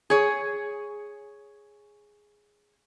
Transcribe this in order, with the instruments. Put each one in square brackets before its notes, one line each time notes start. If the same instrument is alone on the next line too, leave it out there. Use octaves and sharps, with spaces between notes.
[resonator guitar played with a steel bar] G#4 C#5